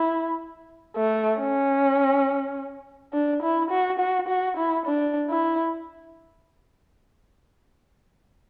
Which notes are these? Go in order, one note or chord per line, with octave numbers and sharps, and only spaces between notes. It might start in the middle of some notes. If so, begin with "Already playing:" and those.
Already playing: E4
A3
C#4
D4
E4
F#4
F#4
F#4
E4
D4
E4